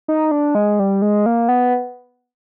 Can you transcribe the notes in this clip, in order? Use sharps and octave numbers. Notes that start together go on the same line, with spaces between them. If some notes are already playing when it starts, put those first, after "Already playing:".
D#4
D4
G#3
G3
G#3
A#3
B3